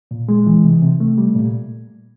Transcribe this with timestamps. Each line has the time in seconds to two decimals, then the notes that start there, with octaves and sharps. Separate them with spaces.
0.11 A#2
0.29 G#3
0.47 E3
0.64 C3
0.82 C3
1.00 A3
1.18 G3
1.35 A#2